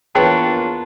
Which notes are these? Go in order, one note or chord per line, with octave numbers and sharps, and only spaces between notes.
E2 A#3 D4 F4 G#4 B4 C#5 G5